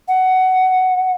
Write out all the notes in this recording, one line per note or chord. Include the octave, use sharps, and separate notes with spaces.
F#5